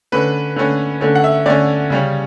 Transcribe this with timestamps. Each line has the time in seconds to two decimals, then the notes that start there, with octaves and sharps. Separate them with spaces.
0.12 D3 A3 C#4 B4
0.56 D3 A3 C#4
1.01 D3 A3 C#4
1.15 F#5
1.24 E5
1.46 D3 A3 C#4 D5
1.90 C#3 G3 C#4